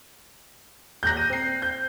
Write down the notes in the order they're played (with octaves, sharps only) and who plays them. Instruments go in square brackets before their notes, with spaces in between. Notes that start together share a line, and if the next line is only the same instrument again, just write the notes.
[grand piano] D#1 A#5 F#6 [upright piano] G6 A#6
[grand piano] D#7
C4 C7
[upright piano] G6